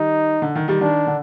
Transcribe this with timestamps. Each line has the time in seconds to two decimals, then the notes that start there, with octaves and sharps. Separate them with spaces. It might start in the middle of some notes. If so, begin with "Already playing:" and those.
Already playing: D#3 G3 D#4
0.42 D3
0.55 D#3
0.68 D#3 G3
0.81 D#3 D4
1.07 D3